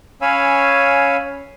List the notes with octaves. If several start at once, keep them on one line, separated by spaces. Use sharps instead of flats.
C#4 C#5 F5 G#5 B5 E6